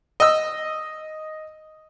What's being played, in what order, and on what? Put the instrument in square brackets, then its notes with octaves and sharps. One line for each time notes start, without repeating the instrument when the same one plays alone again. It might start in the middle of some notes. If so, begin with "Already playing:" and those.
[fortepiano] D#5 E6